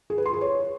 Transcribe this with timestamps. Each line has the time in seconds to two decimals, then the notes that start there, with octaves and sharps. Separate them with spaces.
0.10 G#4
0.18 B4
0.26 C6
0.33 G#4
0.41 C#5